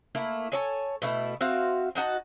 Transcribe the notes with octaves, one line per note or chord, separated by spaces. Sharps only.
A3 A#3 E4
A4 C#5 G#5
B2 A3 E4
C4 F#4 E5 F5
D4 D#4 F#4 A5